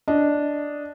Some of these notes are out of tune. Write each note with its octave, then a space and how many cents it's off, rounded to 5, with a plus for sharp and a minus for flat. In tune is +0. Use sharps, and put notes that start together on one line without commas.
D4 -5 D#5 +0